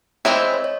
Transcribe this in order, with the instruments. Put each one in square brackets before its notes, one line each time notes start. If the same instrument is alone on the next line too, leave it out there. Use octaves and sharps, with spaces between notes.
[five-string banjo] E3 G#3 C4 E4 [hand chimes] C#5
[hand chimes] D#5
C#5
C#5